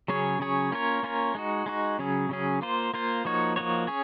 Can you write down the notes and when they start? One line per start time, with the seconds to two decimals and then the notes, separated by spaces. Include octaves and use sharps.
0.08 C#3 F#3 C#4 G#4 C#5
0.40 C#3 F#3 C#4 G#4 C#5
0.72 A#3 C#4 F4 A#4 C#5
1.03 A#3 C#4 F4 A#4 C#5
1.35 G#3 D#4 F#4
1.66 G#3 D#4 F#4
1.99 C#3 F#3 C#4 G#4
2.29 C#3 F#3 C#4 G#4
2.62 A#3 F4 C5
2.94 A#3 F4 C5
3.25 F3 A#3 D#4 F#4 C#5
3.56 F3 A#3 D#4 F#4 C#5
3.87 C#4 G#4 C#5